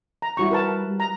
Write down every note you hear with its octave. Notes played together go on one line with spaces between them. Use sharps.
A#5
G3 E4 F#4 C#6
A#4 B4 A5
G3
A#5